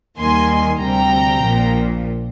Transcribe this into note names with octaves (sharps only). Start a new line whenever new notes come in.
D#2 D#3 G3 A#3 G#5 C6
D2 C3 G3 G5 A#5
A#1 A#2 F3